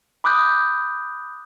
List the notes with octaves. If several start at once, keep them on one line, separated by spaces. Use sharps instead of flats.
B5 D6 D#6 F#6 G6